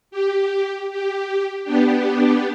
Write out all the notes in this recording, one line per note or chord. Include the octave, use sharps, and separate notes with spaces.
G4
G4
B3 D4 G4